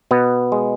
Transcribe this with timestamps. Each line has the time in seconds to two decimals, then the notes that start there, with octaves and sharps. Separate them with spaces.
0.11 B2 B3
0.52 G#3